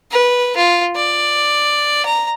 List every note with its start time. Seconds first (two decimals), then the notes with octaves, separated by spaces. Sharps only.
0.11 B4
0.57 F4
0.96 D5
2.05 A#5